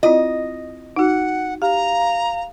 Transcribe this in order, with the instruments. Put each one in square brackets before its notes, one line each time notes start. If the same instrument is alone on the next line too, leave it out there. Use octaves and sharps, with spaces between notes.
[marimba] C4 E4 F4 [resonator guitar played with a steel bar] D#5
[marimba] D#4 F#4 [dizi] F#5
[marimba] G4 [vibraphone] F5 [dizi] A#5